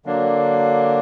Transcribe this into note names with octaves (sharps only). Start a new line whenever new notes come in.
D3 F#3 A#3 D4